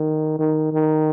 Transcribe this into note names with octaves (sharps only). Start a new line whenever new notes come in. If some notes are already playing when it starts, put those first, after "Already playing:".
Already playing: D#3
D#3
D#3